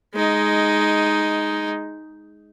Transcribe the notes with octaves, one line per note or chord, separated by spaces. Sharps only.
G#3 D#4